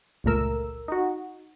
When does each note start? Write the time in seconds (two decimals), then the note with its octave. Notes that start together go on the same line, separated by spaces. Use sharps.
0.24 G1 C#2 A#2 A3 A#4 E6
0.88 D#4 F#4